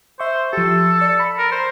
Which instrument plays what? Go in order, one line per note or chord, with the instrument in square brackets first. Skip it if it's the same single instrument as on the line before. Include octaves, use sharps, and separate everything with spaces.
[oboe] C5 [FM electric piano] E5 C#6
[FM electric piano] F3 G4 [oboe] A4
[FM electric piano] D5
B5
[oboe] A#4
C5